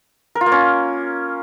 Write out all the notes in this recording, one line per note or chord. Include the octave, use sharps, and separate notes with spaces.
A#4
F4
A#3
C#4